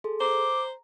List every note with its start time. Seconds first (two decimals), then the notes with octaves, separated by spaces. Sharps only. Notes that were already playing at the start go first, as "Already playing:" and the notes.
0.04 G#4 A4 C6
0.21 C5 A#5 D6